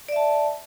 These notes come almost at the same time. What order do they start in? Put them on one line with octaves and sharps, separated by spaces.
D5 E5 A5